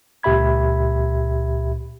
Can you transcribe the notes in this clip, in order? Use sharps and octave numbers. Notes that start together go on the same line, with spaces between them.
C#2 A#2 G4 E5 B5 G#6